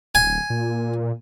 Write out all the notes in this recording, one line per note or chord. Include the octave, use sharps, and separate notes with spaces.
D1 G#5
A#2